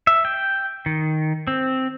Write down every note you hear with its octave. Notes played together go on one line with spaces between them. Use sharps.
E5
G5
D#3
C4